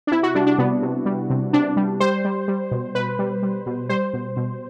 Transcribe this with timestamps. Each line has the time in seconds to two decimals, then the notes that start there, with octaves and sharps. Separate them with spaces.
0.07 D4
0.11 C3 E4
0.23 F#4
0.35 G3 D4
0.47 D4
0.58 C3 B3
0.82 C3
1.06 G3
1.30 C3
1.53 C3 D4
1.77 G3
2.00 G3 C5
2.25 G3
2.48 G3
2.71 B2
2.95 B2 B4
3.19 G3
3.43 G3
3.66 B2
3.89 G3 C5
4.14 B2
4.37 B2